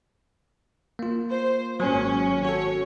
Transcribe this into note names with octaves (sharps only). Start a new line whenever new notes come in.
A#3 F4
C5
G#1 F#3 A#3 C#4
F#4 A4 C#5